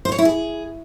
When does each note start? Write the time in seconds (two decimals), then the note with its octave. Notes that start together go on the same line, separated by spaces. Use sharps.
0.05 C5
0.12 C#5
0.19 E4
0.25 G#4